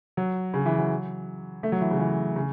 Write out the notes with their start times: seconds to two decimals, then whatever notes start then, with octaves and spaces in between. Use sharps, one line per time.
0.17 F#3
0.54 C#3
0.66 E3
0.79 F#3
1.63 A3
1.72 F#3
1.81 E3
1.91 C#3
1.99 E3
2.36 C#3